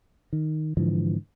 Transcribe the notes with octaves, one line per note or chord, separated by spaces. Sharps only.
D#3
G#2 D3 E3 F3